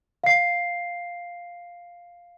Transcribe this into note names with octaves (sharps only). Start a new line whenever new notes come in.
F5 C7